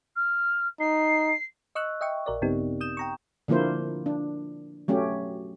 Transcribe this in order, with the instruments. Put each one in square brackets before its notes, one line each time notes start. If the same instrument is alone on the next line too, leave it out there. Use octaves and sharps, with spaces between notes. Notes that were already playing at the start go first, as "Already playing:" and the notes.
[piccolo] F6
[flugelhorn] D#4 [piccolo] C7
[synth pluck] D#5 C#6 E6 F#6
D#5 E5 G5 C#6
A#1 A#4 D5
G2 C#3 B3 C4 D#4 G4
D#6 G6 E7
G5 A#5 C#6
[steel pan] D3 F3 A#3 E4 C5
D4
F#3 A3 C#4 G4